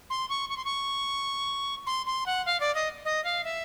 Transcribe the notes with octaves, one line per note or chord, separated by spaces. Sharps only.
C6
C#6
C#6
C6
C#6
C6
C6
F#5
F5
D5
D#5
D#5
F5
E5